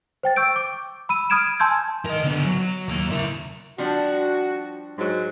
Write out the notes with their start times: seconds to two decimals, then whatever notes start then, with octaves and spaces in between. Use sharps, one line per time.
0.23 C5 G5 A6
0.36 C#6 E6 G6 D7
0.56 D6
1.09 B5 E6 D#7
1.30 B5 D#6 F6 G#6 D7 E7
1.60 G#5 A5 C6 E6 G6 G#6
2.05 A#4 D#5
2.24 D3 B3
2.43 F#3
2.88 D#2 A#3
3.10 E4 A#4
3.78 F3 G3 D4 F#4
4.98 G#2 F#3